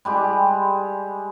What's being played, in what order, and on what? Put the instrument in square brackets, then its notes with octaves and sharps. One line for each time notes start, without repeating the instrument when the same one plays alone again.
[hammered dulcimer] G3 G#3 G4